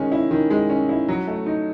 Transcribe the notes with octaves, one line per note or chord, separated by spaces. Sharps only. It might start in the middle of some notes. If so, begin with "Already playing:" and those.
Already playing: D#3 G#3 C#4
E4
D#3
G#3
C#4
E4
F#3
A3
D#4